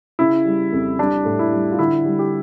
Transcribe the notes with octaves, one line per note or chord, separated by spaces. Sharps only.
C#3 E4
G3
F2
G3 D4
A2
E4
G3
F4
D3 E4
G3
G4